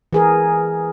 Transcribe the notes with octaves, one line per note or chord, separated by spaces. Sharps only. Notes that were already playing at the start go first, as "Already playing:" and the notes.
E3 G#4 A#4